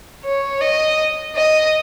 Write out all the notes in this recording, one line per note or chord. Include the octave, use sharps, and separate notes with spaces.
C#5
D#5
D#5